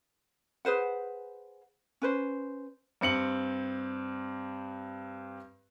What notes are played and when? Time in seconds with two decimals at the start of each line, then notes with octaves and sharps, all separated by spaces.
0.65 G#4 B4 C5 F#5
2.02 C#4 B4 C5
3.01 G2 C4 C#7 F#7